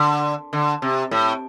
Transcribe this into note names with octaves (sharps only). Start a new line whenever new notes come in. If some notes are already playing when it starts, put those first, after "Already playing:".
Already playing: D3
D3
C3
A2